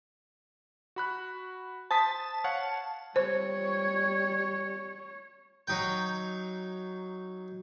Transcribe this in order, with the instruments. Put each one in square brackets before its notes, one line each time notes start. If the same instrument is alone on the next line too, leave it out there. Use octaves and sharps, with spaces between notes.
[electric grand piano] F#4 B5 F#6
[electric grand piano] C5 D#6 B6 [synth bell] A5
[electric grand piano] C#5 F5 F#5
[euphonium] G3 [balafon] C5 [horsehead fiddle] C#5
[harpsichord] F#3 D#4 G5